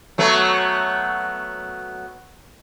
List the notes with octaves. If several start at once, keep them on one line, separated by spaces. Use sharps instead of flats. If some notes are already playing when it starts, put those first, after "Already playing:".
F#3 A3 B3